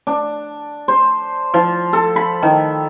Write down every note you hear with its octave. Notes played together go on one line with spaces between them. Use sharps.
D4
C5
F3
A4
B5
D#3